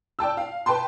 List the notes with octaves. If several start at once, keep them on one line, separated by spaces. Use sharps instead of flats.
D5 G5 A5 E6
F5
B4 G5 A5 C6